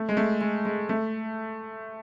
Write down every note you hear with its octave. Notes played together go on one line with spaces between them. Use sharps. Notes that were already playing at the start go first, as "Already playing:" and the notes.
Already playing: A3
G#3
A3
G#3
G#3
A3